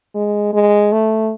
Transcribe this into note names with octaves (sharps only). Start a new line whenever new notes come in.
G#3
G#3
A3